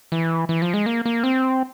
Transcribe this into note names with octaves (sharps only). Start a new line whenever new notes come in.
E3
E3
F3
G#3
A#3
A#3
C4